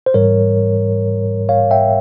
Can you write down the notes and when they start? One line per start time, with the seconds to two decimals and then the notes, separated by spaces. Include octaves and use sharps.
0.06 C5
0.14 G#2 E3 G3 A#4 C#5
1.49 C#5 F5
1.71 E5 G5